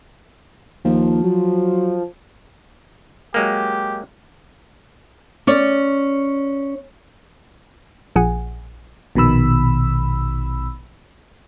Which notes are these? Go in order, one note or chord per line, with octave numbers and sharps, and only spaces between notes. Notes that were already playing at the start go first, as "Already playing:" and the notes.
D#2 F3
F#3
F#3 G#3 A#3 G4
C#4 C#5 D5
A#1 A#2 G#4 F#5 G#5
A#1 B2 D#3 B5 E6